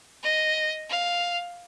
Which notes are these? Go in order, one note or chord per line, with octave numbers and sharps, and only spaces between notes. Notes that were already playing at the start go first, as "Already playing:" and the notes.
D#5
F5